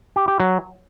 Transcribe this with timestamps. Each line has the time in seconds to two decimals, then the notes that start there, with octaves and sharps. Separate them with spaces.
0.16 G4
0.28 G4
0.40 F#3